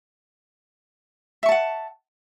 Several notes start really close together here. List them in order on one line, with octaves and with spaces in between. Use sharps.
E5 C#6 A5 F#5